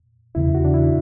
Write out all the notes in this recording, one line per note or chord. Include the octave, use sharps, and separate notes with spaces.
E2 C#3 E3 E4
F#4
D4
E4